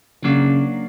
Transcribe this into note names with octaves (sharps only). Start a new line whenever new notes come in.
C#3 F#3 A#3 D4